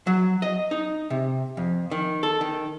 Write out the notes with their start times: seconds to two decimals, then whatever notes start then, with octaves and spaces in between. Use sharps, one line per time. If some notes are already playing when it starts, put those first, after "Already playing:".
0.07 F#3
0.42 D#5
0.71 D#4
1.10 C3
1.57 F2
1.91 D#3
2.23 A4
2.41 D#3